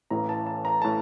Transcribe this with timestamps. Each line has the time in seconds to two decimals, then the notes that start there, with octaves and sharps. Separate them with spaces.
0.11 A1 A2 E3 A#5
0.29 A5
0.47 A5
0.65 A#5
0.82 A2 A5